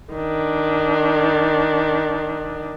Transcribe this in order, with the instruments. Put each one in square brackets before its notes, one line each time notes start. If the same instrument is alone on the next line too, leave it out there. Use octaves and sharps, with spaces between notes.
[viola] D#3 D4